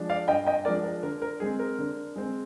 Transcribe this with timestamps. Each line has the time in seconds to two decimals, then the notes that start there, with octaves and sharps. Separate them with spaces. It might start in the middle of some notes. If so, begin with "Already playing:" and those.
Already playing: F3 G#3 D4
0.09 D5 F5
0.28 G2 D#5 G5
0.46 D#5 G5
0.65 F3 G#3 D4 A#4 D5
0.84 A#4
1.03 D3 A#4
1.22 A#4
1.40 G#3 C4 G#4
1.59 A#4
1.79 D3
2.16 G#3 C4